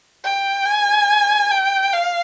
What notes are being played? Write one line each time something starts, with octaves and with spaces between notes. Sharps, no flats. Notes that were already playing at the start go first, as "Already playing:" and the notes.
G5
G#5
G5
F5